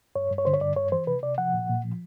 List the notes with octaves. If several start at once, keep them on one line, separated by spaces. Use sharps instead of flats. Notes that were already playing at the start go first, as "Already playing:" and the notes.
G2 C#5
G2
C#5
D3 C5
C#5
G2 D5
G2 C#5
E3 C5
C3 B4
C3 D5
F3 F#5
A#2
A#2
F3